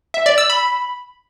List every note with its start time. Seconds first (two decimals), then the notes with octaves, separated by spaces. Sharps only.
0.14 E5
0.26 D5
0.38 E6
0.50 B5